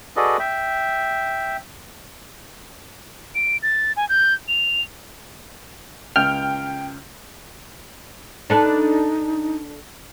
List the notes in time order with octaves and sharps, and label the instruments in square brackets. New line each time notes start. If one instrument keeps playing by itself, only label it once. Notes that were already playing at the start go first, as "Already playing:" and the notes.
[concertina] F#4 G#4 A4 B4 D5 D#5
E5 G5
[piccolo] D7
A6
G#5
G6
F7
[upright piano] C#2 G6 [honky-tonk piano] G5 [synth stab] F6
[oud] D4 A4 B4 [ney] D#4